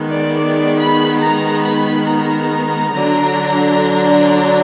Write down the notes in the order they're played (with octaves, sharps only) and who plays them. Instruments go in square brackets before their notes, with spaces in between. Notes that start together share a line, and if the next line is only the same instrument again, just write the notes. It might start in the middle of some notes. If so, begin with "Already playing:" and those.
Already playing: [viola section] D#3 G#3 B3
D5
D5
B5
A#5
B5
A#5
D3 F#3 D4